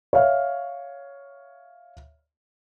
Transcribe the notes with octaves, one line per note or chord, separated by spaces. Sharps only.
C#5 E5 F5